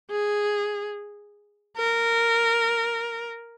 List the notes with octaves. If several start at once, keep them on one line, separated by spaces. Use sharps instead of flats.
G#4
A#4